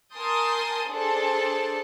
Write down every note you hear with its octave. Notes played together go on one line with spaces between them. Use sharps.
A#4 G#5 A5 C6 D#6 G6
D4 G#4 A4 C5 A5